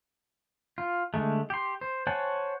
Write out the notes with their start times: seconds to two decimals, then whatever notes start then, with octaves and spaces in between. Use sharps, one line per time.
0.78 F4
1.14 D3 G#3 A3
1.50 G4 C6
1.81 C5
2.07 C5 C#5 F#5 G#5 A5